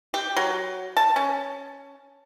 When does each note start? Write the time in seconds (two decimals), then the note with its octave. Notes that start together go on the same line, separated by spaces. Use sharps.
0.14 G4
0.37 F#3
0.97 A5
1.16 C#4